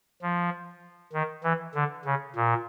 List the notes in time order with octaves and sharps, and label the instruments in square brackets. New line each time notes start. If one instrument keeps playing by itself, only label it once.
[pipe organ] F3
D#3
E3
D3
C#3
A#2